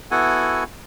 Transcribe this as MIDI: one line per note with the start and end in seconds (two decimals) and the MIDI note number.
0.11 0.64 59
0.11 0.64 64
0.11 0.64 66
0.11 0.64 69
0.11 0.64 78
0.11 0.64 80